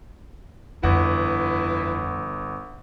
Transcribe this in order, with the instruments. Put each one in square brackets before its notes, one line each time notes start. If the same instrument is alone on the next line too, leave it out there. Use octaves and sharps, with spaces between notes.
[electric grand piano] G1 F#5 [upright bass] F2 [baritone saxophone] E3